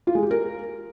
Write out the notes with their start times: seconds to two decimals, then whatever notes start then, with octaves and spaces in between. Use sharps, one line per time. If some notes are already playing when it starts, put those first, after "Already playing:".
0.07 F4
0.15 G#3
0.23 G4
0.31 A#4